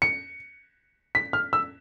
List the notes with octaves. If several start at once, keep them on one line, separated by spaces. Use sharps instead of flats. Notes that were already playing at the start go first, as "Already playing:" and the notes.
C#7
B6
F6
E6